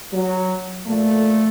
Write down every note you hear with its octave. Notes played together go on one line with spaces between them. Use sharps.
F#3
A#2 F3 A3